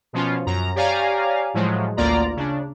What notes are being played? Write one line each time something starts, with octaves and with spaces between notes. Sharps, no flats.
B2 F3 C#4 F4
F#2 A#5
G4 C#5 D5 F5 G#5 A#5
A2 F3 F#3 G#3
A1 D2 A#3 F4 D5 A#5
C#3 D4